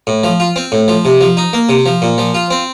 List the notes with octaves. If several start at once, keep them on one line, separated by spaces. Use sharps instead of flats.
A2
F3
F4
C4
A2
F3
C3
F3
D#4
A#3
C3
F3
A#2
F3
F4
C4